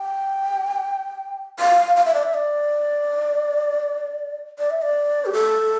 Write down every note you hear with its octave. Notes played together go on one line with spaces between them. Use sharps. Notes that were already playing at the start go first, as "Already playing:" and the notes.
Already playing: G5
F5
F5
E5
D5
E5
D5
D5
E5
D5
G4
A4